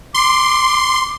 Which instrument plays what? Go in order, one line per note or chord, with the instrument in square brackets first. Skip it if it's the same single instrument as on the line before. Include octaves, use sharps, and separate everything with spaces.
[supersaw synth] C6 [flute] D6